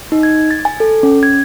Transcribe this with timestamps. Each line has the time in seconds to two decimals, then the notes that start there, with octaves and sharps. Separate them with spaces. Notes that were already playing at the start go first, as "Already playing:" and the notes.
0.12 D#4
0.23 G#6
0.51 A6
0.65 G#5
0.80 A4
1.03 C#4
1.23 G#6